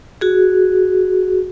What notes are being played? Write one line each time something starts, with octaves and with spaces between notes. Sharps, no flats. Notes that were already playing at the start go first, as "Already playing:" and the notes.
F#4 G#4